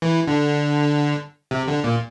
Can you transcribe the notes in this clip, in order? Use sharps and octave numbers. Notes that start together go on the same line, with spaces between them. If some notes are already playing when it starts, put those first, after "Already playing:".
E3
D3
C3
D3
A#2